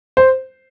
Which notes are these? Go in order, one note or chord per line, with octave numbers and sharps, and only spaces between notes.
C5